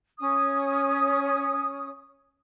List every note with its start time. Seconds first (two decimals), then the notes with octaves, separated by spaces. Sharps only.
0.19 C#4 D#6